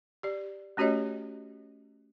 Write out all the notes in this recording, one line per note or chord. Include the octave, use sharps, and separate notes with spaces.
G4 D5
A3 C#4 F#4 G4 C#5 D#5